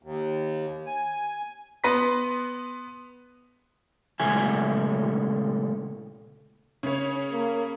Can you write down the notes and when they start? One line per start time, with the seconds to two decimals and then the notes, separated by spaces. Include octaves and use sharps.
0.03 D#2
0.87 G#5
1.84 B3 B4 C6 A#6 B6
4.20 A#2 C#3 G#3 A3 E4 G#5
6.83 C#3 C#5
7.32 A#3